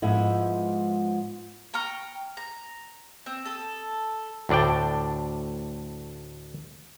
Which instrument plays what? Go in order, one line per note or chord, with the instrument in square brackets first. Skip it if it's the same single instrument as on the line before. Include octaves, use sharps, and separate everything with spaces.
[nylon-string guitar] G#2 F3 G#3 B3 E4
[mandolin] G5 A#5 C#6 F6
A#5
C4
A4 D#6
[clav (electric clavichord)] D2 A2 D4 D5 G5